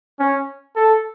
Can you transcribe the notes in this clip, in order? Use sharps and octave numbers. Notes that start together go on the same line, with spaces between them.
C#4
A4